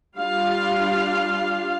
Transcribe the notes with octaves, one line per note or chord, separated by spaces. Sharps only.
G3 D4 F4 F5